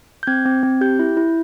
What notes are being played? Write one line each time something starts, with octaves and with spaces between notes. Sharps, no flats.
G6
C4 G#6
C4
C4
G4 G6
E4
E4